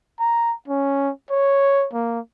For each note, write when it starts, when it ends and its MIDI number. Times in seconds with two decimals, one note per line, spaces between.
0.20 0.54 82
0.68 1.11 61
1.30 1.87 73
1.93 2.20 58